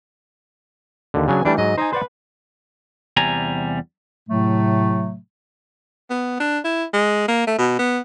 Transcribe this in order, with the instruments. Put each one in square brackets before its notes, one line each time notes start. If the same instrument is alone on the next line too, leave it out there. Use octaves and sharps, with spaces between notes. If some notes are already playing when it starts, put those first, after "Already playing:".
[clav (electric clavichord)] D#2 D3
[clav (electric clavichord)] C#3 F#3 D4 [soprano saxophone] G#5
[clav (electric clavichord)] E3 G3 A3 [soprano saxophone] D4
[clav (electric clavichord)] G#2 F#3 [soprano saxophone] D#5
[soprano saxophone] D#4 [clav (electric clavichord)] C5 D#5 G#5
[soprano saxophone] B4 [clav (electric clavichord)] C5 D5 F#5
[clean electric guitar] E2 C3 G3 G#5 A#5
[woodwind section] A2 C3 F#3 A3
[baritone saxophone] B3
D4
E4
G#3
A#3
A3
B2
B3